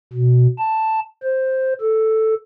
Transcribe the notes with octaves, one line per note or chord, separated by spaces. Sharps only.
B2
A5
C5
A4